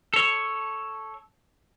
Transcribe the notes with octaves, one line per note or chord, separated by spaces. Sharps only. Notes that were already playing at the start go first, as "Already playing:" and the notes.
A4 C#5